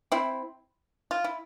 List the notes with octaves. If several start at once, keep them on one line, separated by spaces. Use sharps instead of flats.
C4 E4
F4
E4